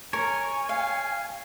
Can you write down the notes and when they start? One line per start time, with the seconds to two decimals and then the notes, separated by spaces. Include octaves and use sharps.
0.13 A#4 C#5 G#5
0.69 F5